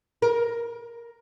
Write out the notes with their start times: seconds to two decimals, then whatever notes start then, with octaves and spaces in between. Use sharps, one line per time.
0.22 A#4